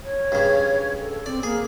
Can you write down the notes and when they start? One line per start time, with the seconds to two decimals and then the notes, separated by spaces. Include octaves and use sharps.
0.04 C#5
0.32 G2 C#3
1.00 A4
1.26 C4 D5
1.43 A#3 G#4